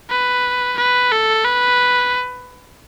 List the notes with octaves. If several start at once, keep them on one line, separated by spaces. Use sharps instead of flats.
B4
B4
A4
B4